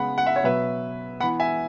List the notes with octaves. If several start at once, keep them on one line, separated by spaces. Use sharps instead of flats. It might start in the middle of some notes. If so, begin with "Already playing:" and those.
Already playing: C#3 G#3 B3 F#5 B5
F#5
E5
C#5
B2 F#3 B3 B4 E5
E3 B3 F#5 B5
E5 G#5